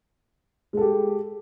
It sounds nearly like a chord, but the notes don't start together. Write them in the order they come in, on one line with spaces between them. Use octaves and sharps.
G#3 A4 G4